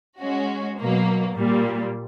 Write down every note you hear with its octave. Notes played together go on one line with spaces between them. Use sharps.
G#3 C#4 F#4
B2 F#3 A#3
A#2 G3 A#3